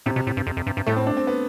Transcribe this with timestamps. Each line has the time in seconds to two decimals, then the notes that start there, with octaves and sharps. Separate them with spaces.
0.06 A2 C3
0.16 B2
0.27 A2
0.37 G2
0.47 F2
0.57 F2
0.67 G2
0.77 G2
0.87 A2 A3
0.97 C4
1.07 D4
1.17 C4
1.27 B3